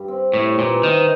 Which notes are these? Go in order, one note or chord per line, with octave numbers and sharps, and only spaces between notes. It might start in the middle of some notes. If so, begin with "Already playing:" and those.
Already playing: G2 G3
C4
A2 C3
A#2 E3
C3 D#3